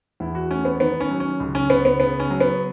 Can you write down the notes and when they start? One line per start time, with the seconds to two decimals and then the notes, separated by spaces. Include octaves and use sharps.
0.20 E2 E4
0.35 F#4
0.50 A3 C#4
0.65 B3
0.80 D#3 B3
1.00 C#4
1.11 F#3
1.20 C#4
1.40 C#2
1.55 C#4
1.70 C#2 B3
1.85 B3
2.00 C#3 B3
2.20 C#4
2.30 F#3
2.40 B3